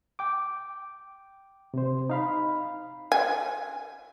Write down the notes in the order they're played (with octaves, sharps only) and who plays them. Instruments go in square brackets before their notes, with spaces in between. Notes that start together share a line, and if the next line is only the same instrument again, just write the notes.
[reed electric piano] G5 D6
C3 C5
D#4 F5 B5
[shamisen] G#5